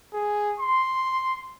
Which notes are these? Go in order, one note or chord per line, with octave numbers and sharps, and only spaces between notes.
G#4
C6